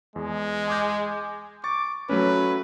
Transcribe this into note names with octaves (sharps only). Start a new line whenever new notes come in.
E2 G#3
G#5 D6 G6
C#6 D6 A6
F#3 A3 C#4 B4